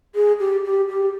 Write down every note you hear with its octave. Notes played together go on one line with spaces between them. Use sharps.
G#4
G4
G4
G4